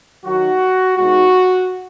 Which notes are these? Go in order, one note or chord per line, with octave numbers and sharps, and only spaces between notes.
D#3 F#3 D#4 F#4
B2 G#3 D#4 F#4